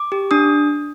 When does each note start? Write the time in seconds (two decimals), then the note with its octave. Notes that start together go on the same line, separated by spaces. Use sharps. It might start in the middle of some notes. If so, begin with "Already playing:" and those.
Already playing: D6
0.12 G4
0.31 D4 D#6